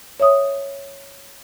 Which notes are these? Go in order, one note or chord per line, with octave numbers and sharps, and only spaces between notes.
C#5 E5 D#6